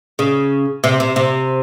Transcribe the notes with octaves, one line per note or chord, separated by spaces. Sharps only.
C#3
C3
C3
C3